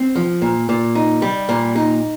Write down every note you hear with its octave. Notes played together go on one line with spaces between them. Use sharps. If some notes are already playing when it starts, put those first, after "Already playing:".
Already playing: C4
F3
A#2
A#2
D#4
G3
A#2
D#4